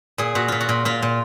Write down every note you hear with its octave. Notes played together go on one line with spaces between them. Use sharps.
A#2 G#4
A#2 F#4
A#2 F4
F#4
A#2
A#2 F4
A#2